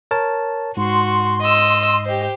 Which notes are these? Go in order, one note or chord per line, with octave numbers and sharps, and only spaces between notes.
A#4 C#5 A5
G#2 F#4 C6
D#5 E6
G4 C5 D#5